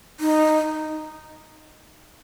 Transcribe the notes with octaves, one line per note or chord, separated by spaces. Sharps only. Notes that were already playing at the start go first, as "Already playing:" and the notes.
D#4